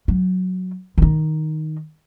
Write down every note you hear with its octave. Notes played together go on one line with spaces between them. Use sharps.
F#3
D#3 D#4